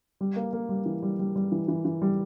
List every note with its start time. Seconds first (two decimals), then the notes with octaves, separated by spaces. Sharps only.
0.21 G3
0.36 A#3
0.53 A#3
0.69 G3
0.86 E3
1.03 G3
1.19 G3
1.36 G3
1.52 E3
1.68 E3
1.85 E3
2.02 G3